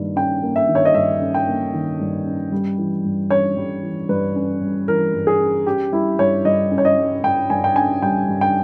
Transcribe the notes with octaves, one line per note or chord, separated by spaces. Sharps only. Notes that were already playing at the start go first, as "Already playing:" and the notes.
Already playing: G2 D#3 A#3
C#4 G5
A#3
E5
D#3
C#5
D#5
G2 E5
C#4
G5
A#3
D#3
G2
C#4
G3
E3
G2
C#4 C#5
G3
E3
G2 B4
C#4
G3
E3 A#4
G2
G#4
C#4
C#4 G4
G3 E4
G2 C#5
G2 D#5
C#4
C#5
D#5
G3
G2 G5
G2 G#5
G5
C#4 G#5
G3 G5
G2
G5